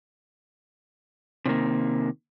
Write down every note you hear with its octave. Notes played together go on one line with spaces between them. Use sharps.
C3 D#3 A#3